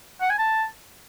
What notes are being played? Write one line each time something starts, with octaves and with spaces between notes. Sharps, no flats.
F#5
G#5
A5